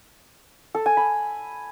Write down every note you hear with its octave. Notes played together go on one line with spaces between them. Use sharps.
A4
G#5
B5